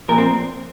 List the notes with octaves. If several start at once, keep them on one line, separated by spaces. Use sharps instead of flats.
A#2 F3 A#4
C4